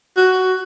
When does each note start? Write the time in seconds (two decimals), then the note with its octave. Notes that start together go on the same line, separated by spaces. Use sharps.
0.17 F#4